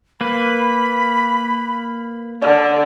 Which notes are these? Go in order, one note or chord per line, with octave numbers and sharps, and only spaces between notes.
A#3 B4 B5
D3 D5